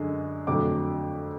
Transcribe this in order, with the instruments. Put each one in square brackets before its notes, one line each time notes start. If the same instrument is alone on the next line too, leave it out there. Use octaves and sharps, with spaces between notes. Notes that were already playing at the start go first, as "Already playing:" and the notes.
Already playing: [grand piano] F#2 D3 G#3
F2 D3 F#3 A3 D6